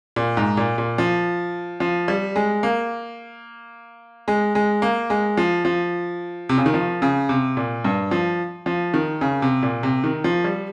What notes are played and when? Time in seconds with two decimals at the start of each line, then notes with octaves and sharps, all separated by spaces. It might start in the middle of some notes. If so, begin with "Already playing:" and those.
0.16 A#2
0.37 G#2
0.57 A#2
0.78 A#2
0.98 F3
1.80 F3
2.08 G3
2.36 G#3
2.63 A#3
4.28 G#3
4.55 G#3
4.82 A#3
5.10 G#3
5.37 F3
5.65 F3
6.49 C3
6.58 C#3
6.66 D#3
6.74 F3
7.02 C#3
7.29 C3
7.57 A#2
7.84 G2
8.11 F3
8.66 F3
8.94 D#3
9.21 C#3
9.42 C3
9.63 A#2
9.83 C3
10.04 D#3
10.24 F3
10.44 G3